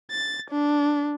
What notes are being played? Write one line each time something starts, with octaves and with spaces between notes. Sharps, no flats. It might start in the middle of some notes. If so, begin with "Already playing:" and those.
A6
D4